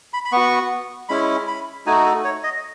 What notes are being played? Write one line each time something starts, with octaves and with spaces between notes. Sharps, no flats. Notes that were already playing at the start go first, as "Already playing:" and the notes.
B5
B5
B3 F#4 C#6
G#3 C#4 E4 B5
B5
A3 D#4 F#4 G#5
A4
C#5
D#5